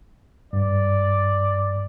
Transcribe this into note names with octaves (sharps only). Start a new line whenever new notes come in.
G2 D5